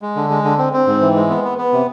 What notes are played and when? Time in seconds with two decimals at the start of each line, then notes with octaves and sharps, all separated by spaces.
0.02 G#3
0.16 D3
0.30 G#3
0.44 D3
0.58 C4
0.73 C4
0.87 G#2
1.01 E3
1.16 G#3
1.30 B3
1.44 B3
1.58 B3
1.73 C3